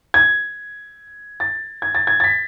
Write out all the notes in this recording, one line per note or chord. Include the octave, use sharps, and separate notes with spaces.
G#6
A6
G#6
A6
G#6
A6
B6